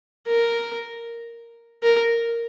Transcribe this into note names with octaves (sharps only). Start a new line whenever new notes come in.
A#4
A#4